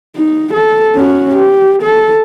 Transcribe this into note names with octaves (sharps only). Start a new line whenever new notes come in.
D#4
A4
C#4 F#4
G4
A4